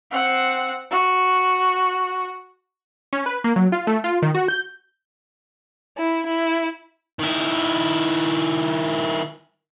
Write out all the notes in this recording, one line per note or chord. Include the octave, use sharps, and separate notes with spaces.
C4 F#5
F#4
C#4
B4
A#3
F#3
F4
A3
F4
D#3
F#4
G6
E4
E4
D#3 E4